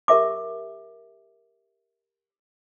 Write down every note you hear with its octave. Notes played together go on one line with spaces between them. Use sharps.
G4 A#4 E5 D6